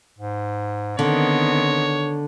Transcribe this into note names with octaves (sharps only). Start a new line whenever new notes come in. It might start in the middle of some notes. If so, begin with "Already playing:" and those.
G#2
D3 D#3 B3 C4 C#5